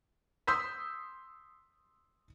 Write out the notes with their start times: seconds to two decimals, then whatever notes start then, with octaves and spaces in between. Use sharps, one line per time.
0.47 C6 D#6 E6 G6 B6